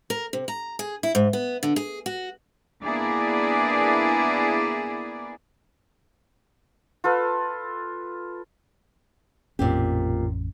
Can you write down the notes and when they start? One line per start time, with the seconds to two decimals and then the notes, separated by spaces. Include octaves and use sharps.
0.10 A#4
0.33 C3
0.48 A#5
0.79 G#4
1.03 E4
1.15 G#2
1.33 B3
1.63 D3
1.76 G#4
2.06 F#4
2.83 A#3 B3 D4 E4 G#4 D5
7.04 F4 A4 B4
9.59 A1 F2 A#2 C4 C#4 G4